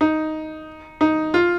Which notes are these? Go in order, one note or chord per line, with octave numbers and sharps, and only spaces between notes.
D#4
D#4
F4